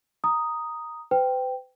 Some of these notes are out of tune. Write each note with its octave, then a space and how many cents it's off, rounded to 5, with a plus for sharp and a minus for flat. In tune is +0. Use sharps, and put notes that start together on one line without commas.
A#5 +0 D#6 +0
B4 +45 G5 +0